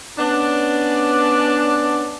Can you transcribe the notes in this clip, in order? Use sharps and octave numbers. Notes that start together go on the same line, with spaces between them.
B3 C#4 D4